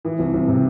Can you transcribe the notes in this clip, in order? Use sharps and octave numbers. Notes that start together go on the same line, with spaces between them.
E3
C2
C2
C3